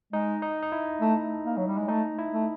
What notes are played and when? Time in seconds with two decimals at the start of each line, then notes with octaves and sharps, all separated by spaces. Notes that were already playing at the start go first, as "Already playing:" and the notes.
0.13 G#3 D#4
0.42 D#4
0.63 D#4
0.72 E4
1.01 A3
1.45 A#3
1.57 F#3
1.67 G3
1.78 G#3
1.88 A3 D#4
2.18 E4
2.33 A3